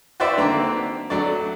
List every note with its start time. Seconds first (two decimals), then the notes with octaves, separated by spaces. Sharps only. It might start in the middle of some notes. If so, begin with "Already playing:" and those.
0.20 F#4 B4 C5 D5 E5 G5
0.37 D3 D#3 A#3 C4
1.10 F#3 A3 D4 D5